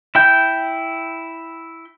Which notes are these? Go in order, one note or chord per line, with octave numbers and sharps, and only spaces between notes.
E4 G5 G6